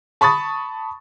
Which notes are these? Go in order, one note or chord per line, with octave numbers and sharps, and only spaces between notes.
A5 B5 C#6 D#6 A6